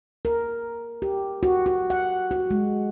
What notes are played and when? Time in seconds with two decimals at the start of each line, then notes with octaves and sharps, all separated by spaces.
0.25 A#4
1.02 G4
1.43 F#4
1.66 F#4
1.90 F#5
2.31 F#4
2.51 G#3